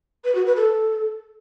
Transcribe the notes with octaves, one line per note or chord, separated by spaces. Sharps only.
B4
F#4
B4
A4